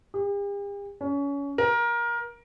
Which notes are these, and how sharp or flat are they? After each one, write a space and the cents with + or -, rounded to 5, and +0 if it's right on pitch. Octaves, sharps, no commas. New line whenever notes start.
G4 +45
C#4 +25
A#4 +20